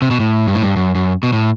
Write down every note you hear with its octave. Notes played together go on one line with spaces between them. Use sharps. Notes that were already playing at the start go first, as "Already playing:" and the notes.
C3
B2
A2
G2
A2
G2
F#2
F#2
B2
A2